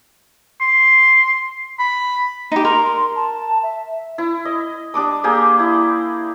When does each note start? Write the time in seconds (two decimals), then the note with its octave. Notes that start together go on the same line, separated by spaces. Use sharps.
0.61 C6
1.79 B5
2.52 D#4 G4
2.65 A#4 C6
3.16 A5
3.63 E5
4.18 E4
4.45 D#5
4.94 G3 D4 D6 D#6
5.24 A#3 G4 G#4 G5
5.59 E4